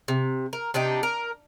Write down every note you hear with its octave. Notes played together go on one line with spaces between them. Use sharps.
C3
A#4
C3 D4 D#4 G4
A#4